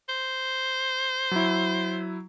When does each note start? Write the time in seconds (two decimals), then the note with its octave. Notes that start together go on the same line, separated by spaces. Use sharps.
0.09 C5
1.31 F#3 E4